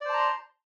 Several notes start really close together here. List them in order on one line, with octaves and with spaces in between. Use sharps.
D5 C5 A5 A#5 C6